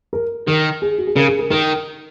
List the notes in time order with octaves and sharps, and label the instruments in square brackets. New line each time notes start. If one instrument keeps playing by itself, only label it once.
[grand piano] A#4
[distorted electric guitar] D#3 [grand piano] A#4
[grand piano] G#4
F#4
G#4
[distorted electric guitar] C#3 [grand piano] A#4
[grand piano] G#4
A#4
[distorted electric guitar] D#3 [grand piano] A#4